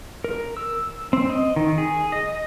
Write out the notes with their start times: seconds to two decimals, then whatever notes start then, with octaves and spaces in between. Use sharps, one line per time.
0.24 A#4
0.57 E6
1.13 C4
1.30 D#5
1.56 D#3
1.78 G#4
2.12 D#5